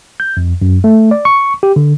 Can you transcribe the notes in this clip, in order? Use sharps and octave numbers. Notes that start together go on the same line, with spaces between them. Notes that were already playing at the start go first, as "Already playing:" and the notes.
G6
F2
F#2
A3
D5
C#6
G4
D3